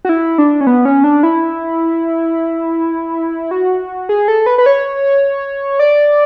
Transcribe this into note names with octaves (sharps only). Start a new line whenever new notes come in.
F#4
E4
D4
C#4
B3
C#4
D4
E4
F#4
G#4
A4
B4
B4
C#5
D5